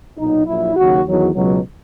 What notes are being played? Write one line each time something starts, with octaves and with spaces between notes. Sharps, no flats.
B1 A#2 F#3 D#4
A#1 A#2 F#3 E4
D#2 C#3 F#3 F#4
E2 D#3 F#3
C#2 B2 F#3